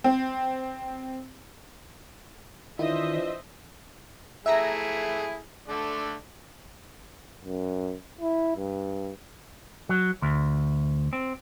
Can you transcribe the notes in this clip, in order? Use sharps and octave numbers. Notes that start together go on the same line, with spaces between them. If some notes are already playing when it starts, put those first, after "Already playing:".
C4
D#3 E3 D4 E4 F4 C5 D#5 E5
A3 E4 G#4 E5 A#5 A#6
D3 A3 D5
F#2
E4
G2
F#3
D2
C4